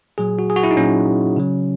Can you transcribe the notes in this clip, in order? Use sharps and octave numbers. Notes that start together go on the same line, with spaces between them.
A#2 F#3 G#4
F#4
G#4
F#4
E4
D#4
A#2 F#3 C#4
C#3 F#3